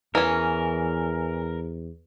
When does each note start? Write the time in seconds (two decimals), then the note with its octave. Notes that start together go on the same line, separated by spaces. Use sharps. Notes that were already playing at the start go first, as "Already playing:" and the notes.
0.15 E2 E3 C#4 A#4